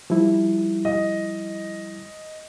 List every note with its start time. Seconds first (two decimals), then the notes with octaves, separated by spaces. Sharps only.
0.10 F3 G3 E4
0.85 D#5